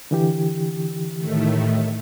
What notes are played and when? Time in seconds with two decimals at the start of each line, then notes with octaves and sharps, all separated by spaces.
0.11 D3 E3 G4
1.18 A2 D#3 A3